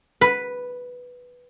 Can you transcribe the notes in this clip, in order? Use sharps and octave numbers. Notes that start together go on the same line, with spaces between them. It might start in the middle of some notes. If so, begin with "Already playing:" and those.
B4